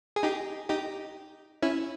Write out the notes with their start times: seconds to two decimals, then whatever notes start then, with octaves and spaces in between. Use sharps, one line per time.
0.16 G#4
0.23 D#4 G4
0.69 D#4 G4
1.62 C#4 E4